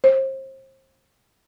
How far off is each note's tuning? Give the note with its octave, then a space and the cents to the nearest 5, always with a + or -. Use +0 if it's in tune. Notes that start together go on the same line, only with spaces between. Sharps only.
C5 +35